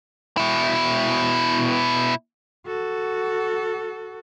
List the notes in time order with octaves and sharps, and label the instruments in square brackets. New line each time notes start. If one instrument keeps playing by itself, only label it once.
[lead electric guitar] B2 E4
[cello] F#4 A4